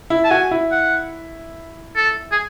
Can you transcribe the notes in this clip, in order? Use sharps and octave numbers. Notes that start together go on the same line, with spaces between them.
E4
A5
F#4 G#5
E4
F#5
A4
G#4